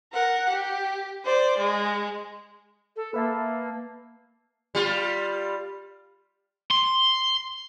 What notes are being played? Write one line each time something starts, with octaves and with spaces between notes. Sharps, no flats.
A#4 F#5
G4
C5 D5
G#3
A4
A#3 B4 E5 A5
G3 F4
C6